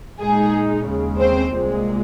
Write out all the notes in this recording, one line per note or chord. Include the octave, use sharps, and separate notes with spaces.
A#2 G#3 D#4 G#4
D#2 C#3 G#3
C4 C5
C2 A#2 G#3